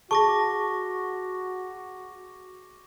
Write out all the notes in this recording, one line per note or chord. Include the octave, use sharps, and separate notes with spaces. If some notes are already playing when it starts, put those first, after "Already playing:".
F#4 G#4 A5 C#6 D6 A#6